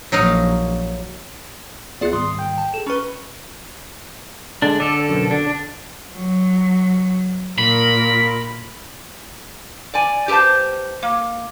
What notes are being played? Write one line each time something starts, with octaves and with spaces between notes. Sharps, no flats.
A#1 F#3 D#4 F5
D2 B3 F4 G#4 D5 E5 F#6
G#2 D#3 G3 C6 D#6
G5
A5
G#4 A4 E7
C#4 B4 A#5 B5 C#6 F6
D3 G#3 D4
D3 A4 D5
F#2 B2
D3 D4
F#3
A#2 A#4 B5
D5 G#5
G4 G#4 B4 C5 A5
A#3